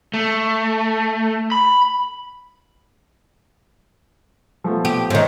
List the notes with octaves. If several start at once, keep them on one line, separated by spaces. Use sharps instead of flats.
A3
B5
F3 A3 B3
G4
G#2 D#3 C5 C#5 D#5